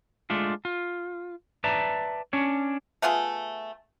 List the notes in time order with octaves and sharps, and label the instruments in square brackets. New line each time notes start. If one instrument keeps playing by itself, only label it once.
[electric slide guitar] G#3 A3 D4 F4
F4
B4 D5 E5 A5 A#5
C#4 D4 C#5
[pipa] A3 B3 F4 G#4